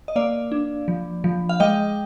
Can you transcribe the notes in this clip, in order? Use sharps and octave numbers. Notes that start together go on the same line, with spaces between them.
D#5
A#3 D5 F5
D4
F3
F3
F5
G#3 D#5 G5